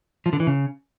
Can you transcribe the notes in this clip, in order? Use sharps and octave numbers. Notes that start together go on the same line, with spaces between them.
F3
D3
E3
C#3